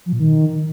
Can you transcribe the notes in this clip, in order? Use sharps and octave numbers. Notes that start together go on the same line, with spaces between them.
F3
A#2
D#3